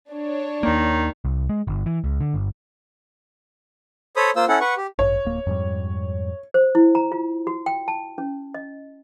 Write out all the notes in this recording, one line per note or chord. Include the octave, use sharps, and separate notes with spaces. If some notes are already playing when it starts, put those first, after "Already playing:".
D4 C#5
D#2 D#3 A#3
C2
G#3
G1
E3
C#2
D3
G1
A4 C5 C#5 B5 D#6
A#3 F4 C5 E6
C#4 E4 A4 F#5
B4 F#5 C#6
G4
A1 G2 C#5
D1 A#3
F2 G#2 G3
C5
E4
A#5
F4
F#4
G5
A5
C#4
D#5